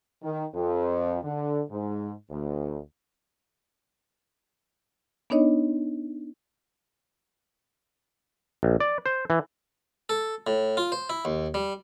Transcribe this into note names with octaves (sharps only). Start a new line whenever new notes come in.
D#3
F2
D3
G#2
D2
B3 D4 D#4 C#5 D#5
A#1
D5
C5
E3
A4
A2
F4
C5
E4
D#2
G3